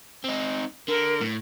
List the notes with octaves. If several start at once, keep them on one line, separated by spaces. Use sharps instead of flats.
C4 D#4
D3 A#4
A2